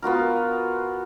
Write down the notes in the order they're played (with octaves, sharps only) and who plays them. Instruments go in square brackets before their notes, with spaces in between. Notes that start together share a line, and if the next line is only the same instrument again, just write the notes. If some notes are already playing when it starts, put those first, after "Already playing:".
[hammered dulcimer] B3 F4 F#4 A#4